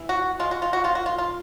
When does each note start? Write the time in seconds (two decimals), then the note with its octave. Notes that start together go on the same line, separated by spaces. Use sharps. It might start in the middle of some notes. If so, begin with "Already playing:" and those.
Already playing: E3
0.09 F#4
0.39 G#3 F4
0.51 F#4
0.62 F4
0.73 F#4
0.84 D#3 F4
0.95 F#4
1.06 F4
1.18 F4